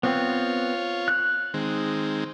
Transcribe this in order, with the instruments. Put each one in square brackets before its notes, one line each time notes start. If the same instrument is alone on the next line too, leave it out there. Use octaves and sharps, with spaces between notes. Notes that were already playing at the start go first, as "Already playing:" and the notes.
[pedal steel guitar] B3 C4 [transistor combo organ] F4 C#5
[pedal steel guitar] F#6
[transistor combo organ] D#3 G#3 C4